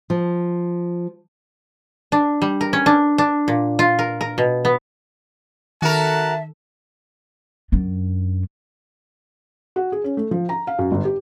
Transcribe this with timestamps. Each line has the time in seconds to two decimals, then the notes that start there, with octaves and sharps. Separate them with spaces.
0.10 F3
2.12 D4
2.42 G3
2.61 A#4
2.73 C#4
2.86 D4
3.18 D4
3.48 A#2
3.79 F4
3.99 A#4
4.21 A#4
4.38 B2
4.65 B3
5.82 D#3 F#4 A4 A#4 E5 A5
7.72 F#2 D4
9.76 F#4
9.92 G#4
10.04 C#4
10.17 A3
10.31 F3
10.49 A#5
10.67 F5
10.79 F#2
10.92 G1
11.05 G4